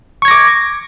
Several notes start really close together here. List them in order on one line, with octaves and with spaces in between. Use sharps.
C#6 G#6 A#6 D6